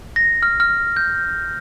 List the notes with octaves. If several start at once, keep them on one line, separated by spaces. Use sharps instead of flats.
A#6
F6
F6
G6